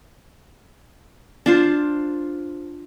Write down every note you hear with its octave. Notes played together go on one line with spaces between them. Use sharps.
D4 F4 C5